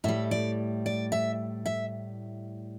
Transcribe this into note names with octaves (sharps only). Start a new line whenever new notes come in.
A2 G3 E5
D5
D5
E5
E5